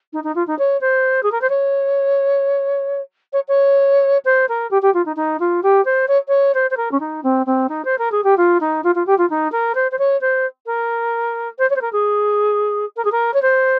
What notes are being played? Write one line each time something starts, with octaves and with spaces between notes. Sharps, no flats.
D#4
D#4
F4
D#4
C#5
C5
G#4
A#4
C5
C#5
C#5
C#5
C5
A#4
G4
G4
F4
D#4
D#4
F4
G4
C5
C#5
C#5
C5
C5
A#4
C#4
D#4
C4
C4
D#4
C5
A#4
G#4
G4
F4
D#4
F4
F4
G4
F4
D#4
A#4
C5
C5
C#5
C5
A#4
C5
C#5
C5
A#4
G#4
A#4
G#4
A#4
C#5
C5